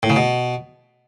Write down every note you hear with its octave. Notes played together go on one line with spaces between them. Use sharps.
A2
C#3
B2